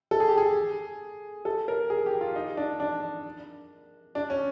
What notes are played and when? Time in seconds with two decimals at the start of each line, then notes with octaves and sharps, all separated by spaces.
0.11 A4
0.20 G#4
0.29 G4
0.38 G#4
1.45 A4
1.68 A#4
1.90 G#4
2.06 G4
2.21 F4
2.36 D#4
2.57 D4
2.80 D4
4.15 D4
4.30 C#4